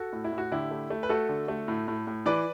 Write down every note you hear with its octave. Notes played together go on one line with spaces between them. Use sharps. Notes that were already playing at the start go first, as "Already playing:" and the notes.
Already playing: F#4 A4
A2
E4
A2
F#4
D3 E4 G4
A3
A3
B4
A3 F#4 A4
D3
A3
A2
A2
A2
E3 B4 D5